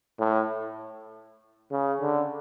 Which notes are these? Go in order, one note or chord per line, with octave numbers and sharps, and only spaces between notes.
A2
C#3
D3